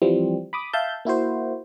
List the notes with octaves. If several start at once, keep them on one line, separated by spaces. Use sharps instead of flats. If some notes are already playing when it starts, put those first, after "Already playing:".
E3 F3 G3 C4
B5 D6 D#6
E5 F5 A5 G6
A#3 E4 F#4 C5